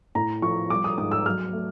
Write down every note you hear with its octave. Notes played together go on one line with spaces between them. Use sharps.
A2 A#5
F3 C#6
G3 D6
D#6
G#2 D#6
E6
F#3 F6
A3